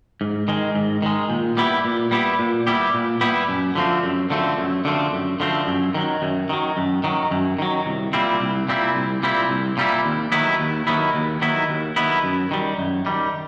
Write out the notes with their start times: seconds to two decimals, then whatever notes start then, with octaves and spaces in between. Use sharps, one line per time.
0.21 G#2
0.48 D#3 G#3
0.75 G#2
1.02 D#3 G#3
1.29 A#2
1.57 G3 B3 E4 G4
1.85 A#2
2.11 G3 B3 E4 G4
2.39 A#2
2.67 G3 B3 E4 G4
2.94 A#2
3.21 G3 B3 E4 G4
3.48 F#2
3.75 D3 F3 A3 C4
4.04 F#2
4.30 D3 F3 A3 C4
4.58 F#2
4.85 D3 F3 A3 C4
5.13 F#2
5.40 D3 F3 A3 C4
5.67 F#2
5.94 D#3 F#3
6.22 F#2
6.49 D#3 F#3
6.77 F#2
7.04 D#3 F#3
7.31 F#2
7.59 D#3 F#3
7.86 C2
8.13 A#2 G3 C4 E4
8.40 C2
8.69 A#2 G3 C4 E4
8.95 C2
9.23 A#2 G3 C4 E4
9.50 C2
9.77 A#2 G3 C4 E4
10.05 D#2
10.32 D#3 F#3 B3 E4
10.60 D#2
10.87 D#3 F#3 B3 E4
11.15 D#2
11.41 D#3 F#3 B3 E4
11.69 D#2
11.96 D#3 F#3 B3 E4
12.24 F#2
12.51 D#3 G3
12.78 F#2
13.06 D#3 G3